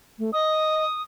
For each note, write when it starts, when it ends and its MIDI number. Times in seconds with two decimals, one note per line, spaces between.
0.18 0.33 57
0.33 0.84 75
0.33 1.02 87